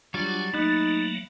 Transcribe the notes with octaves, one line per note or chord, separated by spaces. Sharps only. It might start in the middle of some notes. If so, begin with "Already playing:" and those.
F#3 G3 D4 F4 F#4 G#5 A6
F#3 A3 A#3 D#4 B5 F#6